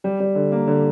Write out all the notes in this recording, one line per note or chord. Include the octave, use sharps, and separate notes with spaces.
G3
G3
D3
A#3
D3